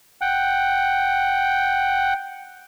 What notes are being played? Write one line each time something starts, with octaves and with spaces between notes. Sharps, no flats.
F#5 G5